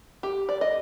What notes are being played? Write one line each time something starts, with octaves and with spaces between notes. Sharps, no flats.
G4
D5
D#5